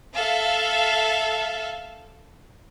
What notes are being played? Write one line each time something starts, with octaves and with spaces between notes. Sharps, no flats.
A4 E5 F5